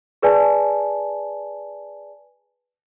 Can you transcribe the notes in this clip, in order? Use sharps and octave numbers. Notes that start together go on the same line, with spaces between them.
G#4 B4 D5 G#5 A5